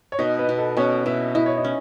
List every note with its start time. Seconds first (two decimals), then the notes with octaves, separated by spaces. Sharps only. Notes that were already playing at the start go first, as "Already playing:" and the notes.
0.12 C#5
0.19 B2 D#4 D#5
0.39 B3 B4
0.49 B2
0.58 A4
0.77 B2 C#4 C#5
1.06 B2 E4 E5
1.35 E4 D#5
1.46 C#5
1.57 D#4 D#5
1.64 C#4